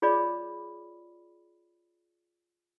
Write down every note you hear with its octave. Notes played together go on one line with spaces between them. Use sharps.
F4 G#4 C#5 D5 B5 D6